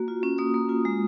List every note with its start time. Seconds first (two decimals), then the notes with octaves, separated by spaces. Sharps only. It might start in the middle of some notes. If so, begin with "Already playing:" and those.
Already playing: A#3 F#4
0.08 F4
0.23 C#4
0.38 A#3 D#6
0.54 A#3
0.69 F4
0.85 G#3